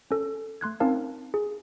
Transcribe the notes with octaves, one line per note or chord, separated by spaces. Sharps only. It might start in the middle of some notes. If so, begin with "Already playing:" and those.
C#4 A4
A3 C6 F#6 G#6
C4 C#4 D#4 A#4 F5 A5
G#4